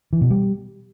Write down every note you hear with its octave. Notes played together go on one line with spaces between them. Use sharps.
E3
B2
G3